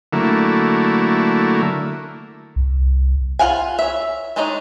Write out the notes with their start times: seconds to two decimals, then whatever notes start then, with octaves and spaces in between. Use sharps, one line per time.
0.13 D3 F#3 A3 A#3 E4
2.56 C2
3.39 F4 B4 F5 F#5 G#5
3.79 C#5 E5
4.36 G#3 D4 D#4 C#5 D#5